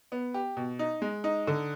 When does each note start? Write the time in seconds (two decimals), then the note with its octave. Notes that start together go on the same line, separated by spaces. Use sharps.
0.12 B3
0.34 G4
0.57 B2
0.79 D#4
1.02 G#3
1.24 D#4
1.47 D3